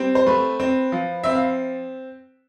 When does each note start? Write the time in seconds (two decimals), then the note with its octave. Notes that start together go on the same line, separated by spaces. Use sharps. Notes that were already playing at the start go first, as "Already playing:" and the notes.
Already playing: G3 C4
0.15 C5
0.26 A3 B4
0.60 C4
0.92 F3
1.24 C4 E5
1.35 F5